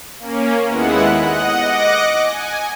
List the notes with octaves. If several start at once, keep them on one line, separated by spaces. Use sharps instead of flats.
A#3 C#4
D#2 G#3 B3 E4 F#5
D#5 F#5
D#5 D6 F#6 A#6 C#7
G#5